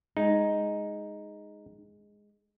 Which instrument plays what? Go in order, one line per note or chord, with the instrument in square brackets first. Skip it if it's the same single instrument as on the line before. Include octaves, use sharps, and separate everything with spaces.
[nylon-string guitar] G#3 [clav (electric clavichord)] D#4